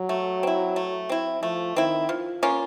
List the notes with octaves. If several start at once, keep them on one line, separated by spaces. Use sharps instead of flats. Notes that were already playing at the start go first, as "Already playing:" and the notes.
Already playing: F#3
A3
C4 E4
A3
C4 E4
F3 A3
D#3 C4 E4
F3
A#3 C#4 F4